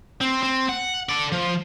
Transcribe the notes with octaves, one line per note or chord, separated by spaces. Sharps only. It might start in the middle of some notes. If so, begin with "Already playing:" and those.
C4
C4
F#5
A4 D5
F3